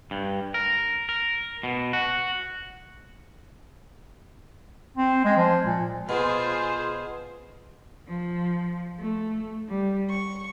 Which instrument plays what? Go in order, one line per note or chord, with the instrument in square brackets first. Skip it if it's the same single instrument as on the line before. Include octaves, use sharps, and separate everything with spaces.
[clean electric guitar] G2
A#4
A#4
B2
F#4
[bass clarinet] C4
G#3
F3
A#2
[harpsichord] B2 [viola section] F4 G#4 C5
[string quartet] F3
A3
G3
C#6